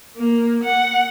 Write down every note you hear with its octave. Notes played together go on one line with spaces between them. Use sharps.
A#3
F#5